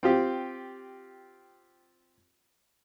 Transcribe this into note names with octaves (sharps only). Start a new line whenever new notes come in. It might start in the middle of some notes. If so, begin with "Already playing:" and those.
C4 F4 G4